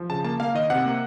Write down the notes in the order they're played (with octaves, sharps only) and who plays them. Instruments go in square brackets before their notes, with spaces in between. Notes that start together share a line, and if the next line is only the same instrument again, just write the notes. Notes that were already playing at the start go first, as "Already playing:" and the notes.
Already playing: [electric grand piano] F3
C#3 A5
A#3 A5
A#3 F5
D#3 D#5
C3 F#5
A#3